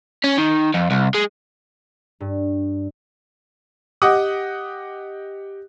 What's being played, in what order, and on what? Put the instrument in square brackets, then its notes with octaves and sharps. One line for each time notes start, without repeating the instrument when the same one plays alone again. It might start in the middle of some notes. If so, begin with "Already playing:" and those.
[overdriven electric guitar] C#4
D#3
F2
C2
G#3
[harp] G2
[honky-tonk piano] G4 D#5 F#5 D6 D#6 F#6